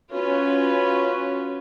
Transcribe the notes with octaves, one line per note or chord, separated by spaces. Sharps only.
C#4 F4 F#4 B4